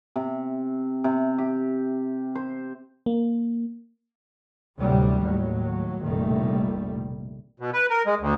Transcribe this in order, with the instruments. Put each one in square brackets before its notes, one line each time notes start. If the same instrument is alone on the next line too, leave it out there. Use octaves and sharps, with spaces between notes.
[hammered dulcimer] C3
C3
G4
C5
[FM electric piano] A#3
[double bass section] A1 D2 C3 F#3 G3
D#2 A2 F#3
F1 A#1 B2 D#3 G3 A3
[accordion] B2
B4
A#4
G#3
D2